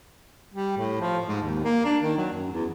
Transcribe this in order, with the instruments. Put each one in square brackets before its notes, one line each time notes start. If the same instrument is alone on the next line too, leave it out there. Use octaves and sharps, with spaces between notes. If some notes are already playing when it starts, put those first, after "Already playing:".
[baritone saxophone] G3
A2
F3
G#2
D#2
A#3
D4
D#3
F#3
F#2
E2